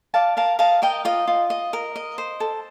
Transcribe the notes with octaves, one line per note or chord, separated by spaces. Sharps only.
D5 F5 A5
A#4 F5 A5
D#5 F5 A5
A#4 D#5 G5
F4 D#5
F4
D#5
A#4
D#5
C5
A4